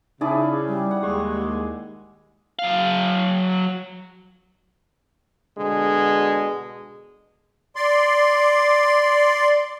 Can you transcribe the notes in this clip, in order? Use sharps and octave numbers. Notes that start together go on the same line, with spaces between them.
C#3 D#4 E4 G#4 D5 D#6
G3
F#5
D#2 G#3 G4
F#3 F5
B2 D3 G#3
D5 C6